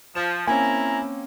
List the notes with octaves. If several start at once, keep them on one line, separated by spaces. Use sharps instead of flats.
F3 E7
A#3 C4 C#4 E4 G#5 A#5